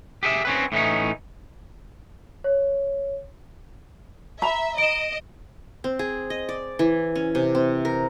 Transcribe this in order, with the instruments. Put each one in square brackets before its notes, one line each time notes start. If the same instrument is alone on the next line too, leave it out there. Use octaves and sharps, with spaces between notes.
[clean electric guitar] G4 G#4 B4 E5
C4 C#4 B4
A2 E3 C#4 D#4
[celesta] C#5
[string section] E5 [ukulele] A#5 B5
[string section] D#5 [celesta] D7 E7
[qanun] C4
G#4
D#5
D5
E3
C#4
C3
C4
A#4